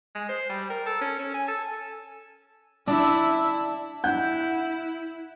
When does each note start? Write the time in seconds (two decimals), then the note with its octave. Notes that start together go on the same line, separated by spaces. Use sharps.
0.15 G#3
0.29 C5
0.49 G3
0.70 A#4
0.86 A4
1.01 C#4
1.19 C#4
1.34 G#5
1.48 A4
2.88 D4 E4 E5
4.04 E4 F#5 F#6 G6